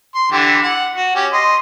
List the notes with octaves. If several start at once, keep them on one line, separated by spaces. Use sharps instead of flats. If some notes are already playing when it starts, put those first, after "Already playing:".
C6
D3 E3 G4
F#5
F#4
C#4 G4
D#5 C6